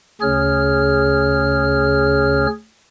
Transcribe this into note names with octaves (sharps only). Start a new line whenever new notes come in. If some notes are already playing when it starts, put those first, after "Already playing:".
D2 C#3 C#4 G#4 C#5 F6